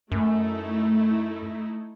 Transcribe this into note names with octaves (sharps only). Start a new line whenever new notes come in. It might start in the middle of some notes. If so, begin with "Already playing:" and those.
F#2 A3 D#4 E4